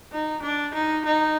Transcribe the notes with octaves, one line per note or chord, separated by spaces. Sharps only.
D#4
D4
D#4
D#4